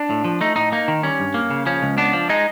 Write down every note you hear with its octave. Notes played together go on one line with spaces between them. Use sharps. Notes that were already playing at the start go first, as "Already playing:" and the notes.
Already playing: D4
A2
F3
A3 D#4
A2 D#4
A#3 D#4
D#3
G3 C#4
G2
A#3
C#3
F3 C#4
C#2
B3 D4
F3
G#3 D#4